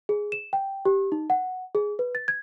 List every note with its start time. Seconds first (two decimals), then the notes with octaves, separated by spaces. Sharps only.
0.09 G#4
0.32 E7
0.53 G5
0.85 G4
1.12 D#4
1.30 F#5
1.75 G#4
1.99 B4
2.15 A6
2.28 G#6